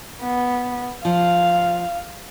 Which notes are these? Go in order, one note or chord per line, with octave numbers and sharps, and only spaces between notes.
B3
F3 F5